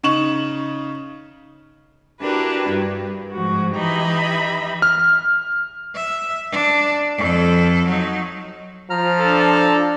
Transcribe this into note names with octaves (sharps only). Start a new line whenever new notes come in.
C#3 D#4 C#6 E7 F#7
D4 E4 F#4 G4 A#4 B4
G2
G#2 F3 F#4
E3 D#4 G4 D#5 E5 B5
F6
E5
D4
F2 A4
F#3 D#4
F3 A#5 F6
D4 A4